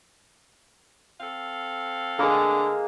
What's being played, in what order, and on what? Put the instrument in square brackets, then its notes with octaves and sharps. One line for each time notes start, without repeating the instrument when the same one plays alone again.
[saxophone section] C4 A4 F5
[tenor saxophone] D3 [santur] G#3 A#3